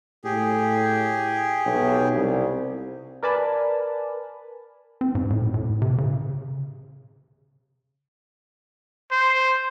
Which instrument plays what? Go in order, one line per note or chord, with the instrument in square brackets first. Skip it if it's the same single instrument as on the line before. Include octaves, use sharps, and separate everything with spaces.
[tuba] A2 [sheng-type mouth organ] G4 G#4
[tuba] B1
C2
[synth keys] A#4 B4 D5 G#5 A5 B5
[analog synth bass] C4
G#2
A2
A2
C3
C#3
[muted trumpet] C5